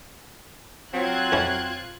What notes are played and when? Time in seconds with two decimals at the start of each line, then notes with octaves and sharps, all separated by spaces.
0.94 F#3 C4 F4 F#6 G#6
1.32 F2 C#4 E4